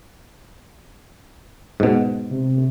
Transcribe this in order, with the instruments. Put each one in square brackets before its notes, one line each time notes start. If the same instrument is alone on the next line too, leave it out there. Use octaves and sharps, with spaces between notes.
[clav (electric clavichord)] G#2 B2
[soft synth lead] C3